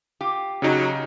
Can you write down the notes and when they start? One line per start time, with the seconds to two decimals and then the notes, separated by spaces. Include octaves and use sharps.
0.21 F4 G4
0.62 C#3 F#3 D#4